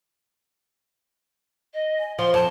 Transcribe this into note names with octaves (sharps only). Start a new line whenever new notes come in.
D#5
G#5
F3 C5 C6
F2 C5 A5